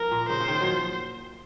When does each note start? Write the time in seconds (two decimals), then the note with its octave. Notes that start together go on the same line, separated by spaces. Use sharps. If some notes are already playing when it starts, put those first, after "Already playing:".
Already playing: F3 A#4
0.11 A#2
0.29 C#3 C5
0.40 C#3
0.48 D#3
0.61 F#3
0.67 F3